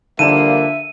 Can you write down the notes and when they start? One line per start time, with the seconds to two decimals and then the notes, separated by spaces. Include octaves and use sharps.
0.19 D3 F3 G3 A#3 E5 D#7 E7